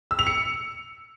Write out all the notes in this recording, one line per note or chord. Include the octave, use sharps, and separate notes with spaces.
E6
F7
C#7